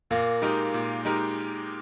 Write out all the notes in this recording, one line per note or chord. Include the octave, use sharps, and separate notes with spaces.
A#2 A#3
G#3 D#4 G4 A#4
A#2
G#3 D#4 G4 A#4